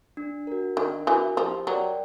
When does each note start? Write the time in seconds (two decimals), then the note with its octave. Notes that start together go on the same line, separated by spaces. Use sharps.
0.17 D4
0.47 F#4 A#4
0.77 D#3 D4
1.07 E3 F#4 A#4
1.37 F3 G4
1.67 F#3 A#4 D5 G5